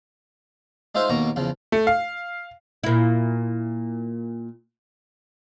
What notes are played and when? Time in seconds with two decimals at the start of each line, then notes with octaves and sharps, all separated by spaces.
0.95 G#3 D#4 F4 C5 E5 F5
1.10 D#2 B2 A#3 A#5 C#6
1.36 E2 C#3 F3
1.72 A3
1.87 F5
2.84 A#2 E4